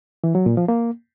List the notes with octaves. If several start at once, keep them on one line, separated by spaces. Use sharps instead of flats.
E3
F#3
A#2
F3
A#3